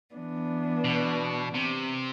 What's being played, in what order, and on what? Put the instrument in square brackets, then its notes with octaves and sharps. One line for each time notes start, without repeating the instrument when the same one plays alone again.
[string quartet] E3 B3 D4
[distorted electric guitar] B2
C3